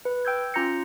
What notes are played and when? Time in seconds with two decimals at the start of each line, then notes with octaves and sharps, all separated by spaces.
0.05 B4
0.25 G5 E6 G6 G#6
0.54 C#4 F4 A#5 G6 A#6 C#7